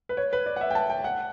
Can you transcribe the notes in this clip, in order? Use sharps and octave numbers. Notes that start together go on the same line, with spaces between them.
B4
C#5
B4
D5
F#5
E5
G5
A5
G5
F#5